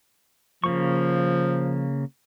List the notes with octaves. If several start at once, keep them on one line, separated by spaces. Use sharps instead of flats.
C#3 F3 A#3 C#6